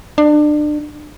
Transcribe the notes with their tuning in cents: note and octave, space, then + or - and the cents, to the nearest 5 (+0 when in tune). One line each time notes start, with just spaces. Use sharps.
D4 +30